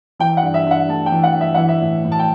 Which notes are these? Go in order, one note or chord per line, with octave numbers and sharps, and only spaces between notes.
E3 G5
F#5
G2
E5
G2 F#5
A3 A5
G5
E3
F#5
G2
E5
E3 F#5
E5
A2
A2
A5
G5